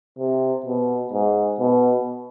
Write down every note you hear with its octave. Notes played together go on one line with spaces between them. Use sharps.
C3
B2
G#2
B2